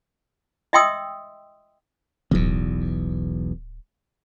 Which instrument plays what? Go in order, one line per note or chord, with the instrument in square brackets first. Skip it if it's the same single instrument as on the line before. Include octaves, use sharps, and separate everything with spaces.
[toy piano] D#5 E5 G5 C6 D#6 E6
[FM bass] D1 [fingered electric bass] B1 E2